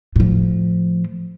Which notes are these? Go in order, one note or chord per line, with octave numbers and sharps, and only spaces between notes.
A2 F3